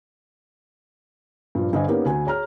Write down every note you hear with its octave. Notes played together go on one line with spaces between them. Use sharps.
G2 A#2 F3
G2 D3 C5 D#5 G#5
A#3 B3 C#4 D#4 G4 A#4
D2 G#5
G#4 C#5 A#5 F6